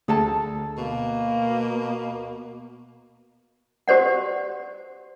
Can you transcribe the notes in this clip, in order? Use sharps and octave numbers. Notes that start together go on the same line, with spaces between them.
D2 G#4 A4 A5
B2 A#3
F#4 G4 C5 D5 F#5